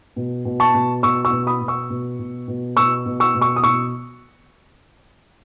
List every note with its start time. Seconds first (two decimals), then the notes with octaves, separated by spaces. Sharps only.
0.16 B2
0.45 B2
0.60 A5 C#6
0.74 B2
1.03 B2 C#6 E6
1.25 C#6 E6
1.32 B2
1.47 B5 D#6
1.61 B2
1.68 C#6 E6
1.90 B2
2.19 B2
2.48 B2
2.77 B2 C#6 E6
3.06 B2
3.20 C#6 E6
3.35 B2
3.41 C#6 E6
3.56 D#6
3.63 B2 C#6 E6